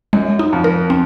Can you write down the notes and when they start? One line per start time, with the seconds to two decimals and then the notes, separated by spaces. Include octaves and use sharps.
0.13 F#2 G#3
0.39 D#4
0.52 F2
0.64 A#4
0.90 C4